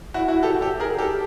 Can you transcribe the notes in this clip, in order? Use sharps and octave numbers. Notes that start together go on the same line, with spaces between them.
E4 F#4
E4 F#4
G4 A4
G4 A4
G#4 A#4
G4 A4